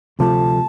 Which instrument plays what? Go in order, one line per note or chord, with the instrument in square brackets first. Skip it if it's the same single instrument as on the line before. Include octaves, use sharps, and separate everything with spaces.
[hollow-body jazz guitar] D2 C3 F3 A3 [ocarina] A5